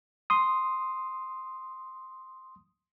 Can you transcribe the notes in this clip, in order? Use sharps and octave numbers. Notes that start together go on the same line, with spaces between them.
C6 D#6